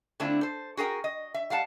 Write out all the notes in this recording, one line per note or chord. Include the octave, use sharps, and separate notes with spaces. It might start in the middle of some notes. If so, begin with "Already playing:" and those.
D3 A3 C4 D4 E4 F4
A4 C5
F#4 G#4 A#4 G5
D#5
E5
G3 F5 F#5 A5